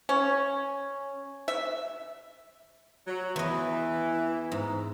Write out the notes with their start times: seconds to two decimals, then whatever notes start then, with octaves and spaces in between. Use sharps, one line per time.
0.09 C#4
1.48 E5
3.08 F#3
3.36 E2 E3 D#5
4.52 G#2